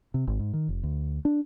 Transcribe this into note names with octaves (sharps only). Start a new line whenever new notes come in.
C3
G#1
G#2
D#3
F1
D2
D4